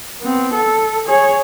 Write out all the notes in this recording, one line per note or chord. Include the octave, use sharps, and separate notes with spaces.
B3 C4
A4
G#4 C#5